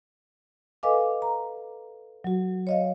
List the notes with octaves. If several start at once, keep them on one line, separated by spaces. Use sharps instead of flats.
A4 B4 D#5 F5 G#5 D6
A#5
F#3 F#4
C#5 D#5 F5